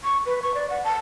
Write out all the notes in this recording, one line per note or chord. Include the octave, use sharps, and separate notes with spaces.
C#6
B4
C#6
D5
F#5
A5